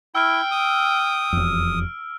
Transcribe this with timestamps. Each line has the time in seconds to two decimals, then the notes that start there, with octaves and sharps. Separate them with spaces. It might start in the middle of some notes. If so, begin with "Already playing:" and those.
0.15 E4 G5 E6 F6 D7
0.51 D#6
1.33 E1 F2